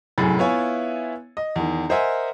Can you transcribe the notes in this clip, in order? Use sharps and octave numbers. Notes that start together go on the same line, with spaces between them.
F1 F#2 A2 G#4 B5 A6
B3 E4 F4 C#5 E5 G#5
D#5
E2 D#3
A#4 C5 D#5 E5 F#5 G#5